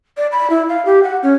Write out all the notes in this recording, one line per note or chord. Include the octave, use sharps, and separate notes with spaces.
D5
B5
E4
F5
G4
F#5
C#4